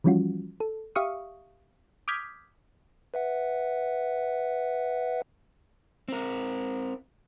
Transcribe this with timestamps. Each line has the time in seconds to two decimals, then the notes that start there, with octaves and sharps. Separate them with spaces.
0.04 E3 F3 G3 C#4 F4 F#4
0.60 A4
0.95 G4 E5 F5 C#6 D#6
2.08 D6 D#6 F6 G6 G#6 B6
3.14 B4 E5 F#5
6.08 C4 A#4